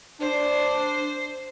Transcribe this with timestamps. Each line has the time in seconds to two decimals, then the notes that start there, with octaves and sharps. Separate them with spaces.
0.21 D4 C5